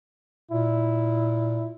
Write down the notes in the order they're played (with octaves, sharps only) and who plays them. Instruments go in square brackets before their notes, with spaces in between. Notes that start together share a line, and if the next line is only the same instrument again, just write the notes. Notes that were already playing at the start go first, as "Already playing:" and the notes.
[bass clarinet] A#2 [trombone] E4